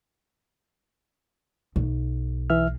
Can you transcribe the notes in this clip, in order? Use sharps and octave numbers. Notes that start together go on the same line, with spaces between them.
B1
E3 E5 F6